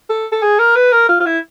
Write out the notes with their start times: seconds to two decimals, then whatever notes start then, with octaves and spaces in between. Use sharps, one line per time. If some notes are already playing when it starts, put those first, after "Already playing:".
0.10 A4
0.32 A4
0.42 G#4
0.59 A#4
0.76 B4
0.92 A#4
1.09 F4
1.20 F4
1.26 E4